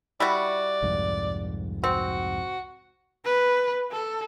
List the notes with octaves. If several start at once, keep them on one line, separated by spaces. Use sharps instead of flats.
G3 E4 F#4 D5
C2 F2 G#2
C4 F#4
B4
A4